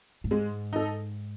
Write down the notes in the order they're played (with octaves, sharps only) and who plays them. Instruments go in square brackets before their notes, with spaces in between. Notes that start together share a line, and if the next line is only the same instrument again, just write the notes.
[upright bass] A2
[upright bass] G#2 [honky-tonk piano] G#3
[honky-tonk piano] D#4 A4